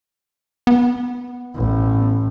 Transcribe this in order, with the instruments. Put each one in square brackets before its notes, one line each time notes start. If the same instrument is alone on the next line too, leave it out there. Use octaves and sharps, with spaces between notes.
[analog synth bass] B3
[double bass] A1